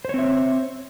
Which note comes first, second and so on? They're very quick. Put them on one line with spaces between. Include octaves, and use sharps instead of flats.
C5 C#5 C4 E5